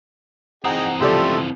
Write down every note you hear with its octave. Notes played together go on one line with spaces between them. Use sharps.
E3 C4 D#4 G#4 F#5 G5 A#5 D#6
C#2 F3 G3 A3 G4 A4 D5 C6